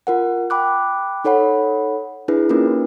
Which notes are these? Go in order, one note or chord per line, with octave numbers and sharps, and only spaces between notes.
F4 A#4 F#5
G5 B5 D6 F#6
D#4 A4 C#5 F#5 B5
D4 E4 G#4 B4
A#3 C#4 D#4 F4 A#4 B4